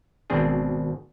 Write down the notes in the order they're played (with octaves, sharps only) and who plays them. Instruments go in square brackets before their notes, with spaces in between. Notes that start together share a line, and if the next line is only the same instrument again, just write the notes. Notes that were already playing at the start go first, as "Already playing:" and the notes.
[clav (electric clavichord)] G#1 B2 C4 D4 G#4